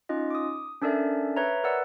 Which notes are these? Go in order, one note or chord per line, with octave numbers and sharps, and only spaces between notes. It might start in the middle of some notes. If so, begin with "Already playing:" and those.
C#4 D#4 F4 D#5
D6 D#6
C#4 D4 A4 A#4 D5 E5
B4 C#5 E5 A#5
A#4 B4 D5 F#5 E6